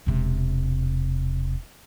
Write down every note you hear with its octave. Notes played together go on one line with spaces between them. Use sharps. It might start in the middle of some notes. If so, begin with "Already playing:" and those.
E1 C3